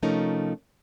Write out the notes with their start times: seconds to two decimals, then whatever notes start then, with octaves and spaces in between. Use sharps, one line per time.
0.02 C3 F3 A3 C#4 D#4 A#4